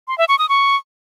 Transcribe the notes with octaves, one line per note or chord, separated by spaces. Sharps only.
C6
E5
C#6
D#6
C#6